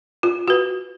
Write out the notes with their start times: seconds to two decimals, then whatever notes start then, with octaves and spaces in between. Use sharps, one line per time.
0.23 F4
0.48 F#4 B4